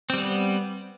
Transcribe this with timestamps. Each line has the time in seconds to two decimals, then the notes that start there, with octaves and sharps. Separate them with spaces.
0.10 C4
0.14 G3
0.17 B3